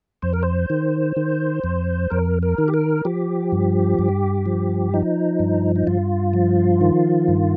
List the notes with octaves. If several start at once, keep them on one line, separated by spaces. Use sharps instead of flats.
F2 C5
A#4
C5
D#3
D#3
F2
F2 A#4
A#4
D#3
G4
A#4
F3 G4
G2
G2
F3
F3 D#4
G2
D#4
G2 F4
F3
D#3
G2